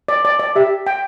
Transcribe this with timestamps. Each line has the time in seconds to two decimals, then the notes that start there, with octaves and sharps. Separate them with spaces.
0.08 D5
0.25 D5
0.40 D5
0.56 G4 E5
0.87 G5